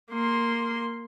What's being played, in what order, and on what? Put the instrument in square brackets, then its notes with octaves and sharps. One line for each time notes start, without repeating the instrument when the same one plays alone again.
[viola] A#3 C6